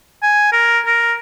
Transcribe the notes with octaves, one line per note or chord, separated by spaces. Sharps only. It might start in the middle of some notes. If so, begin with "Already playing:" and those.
G#5
A#4
A#4